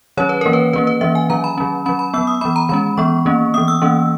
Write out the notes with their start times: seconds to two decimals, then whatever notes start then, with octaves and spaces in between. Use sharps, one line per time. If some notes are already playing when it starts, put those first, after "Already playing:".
0.17 D#3 F#3 C#4 C#5
0.29 B4
0.41 E3 A#3 C#4 A#4
0.53 B4
0.73 D#3 A#3 C#4 B4
0.87 B4
1.01 E3 A#3 C#4 E5
1.15 G#5
1.30 D#3 F#3 C#4 A#5
1.44 B5
1.58 D#3 F#3 C#4
1.86 F#3 C#4 B5
1.99 B5
2.14 F#3 B3 E6
2.27 D#6
2.41 E3 B3 B5
2.56 A#5
2.69 D#3 G#3 C#4 B5
2.97 E3 B3 C#6
3.26 D#3 A#3 C#4
3.54 E3 B3 D#6
3.68 E6
3.82 E3 A#3 C#4